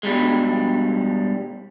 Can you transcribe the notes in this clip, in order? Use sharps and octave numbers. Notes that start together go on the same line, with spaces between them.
G2 B2 G3 G#3